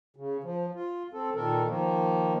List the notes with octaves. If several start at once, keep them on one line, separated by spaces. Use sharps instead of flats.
C#3
F3
F4
C4 A4
A#2 D#3 A4 A#4
D#3 F3 A#3